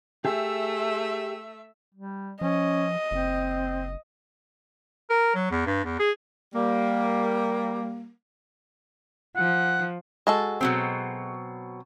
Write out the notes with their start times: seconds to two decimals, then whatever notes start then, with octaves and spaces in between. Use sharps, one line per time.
0.25 A3 G4 G#4 E5
1.94 G3
2.41 F3 C#4 D#5
3.11 F#1 C4
5.10 A#4
5.35 F#3
5.51 E2
5.67 G2
5.84 E2
5.99 G#4
6.55 G3 A#3
9.37 F3 F#5
10.27 G#3 F#4 A4
10.61 B2 F#3 C4